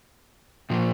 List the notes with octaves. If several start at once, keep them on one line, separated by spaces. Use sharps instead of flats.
A#2 F3 A#3